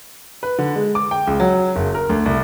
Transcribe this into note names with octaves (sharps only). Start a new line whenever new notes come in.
B4
D3
G#3
D6
G5
C#2
F#3
F#1
A#4
D2
C2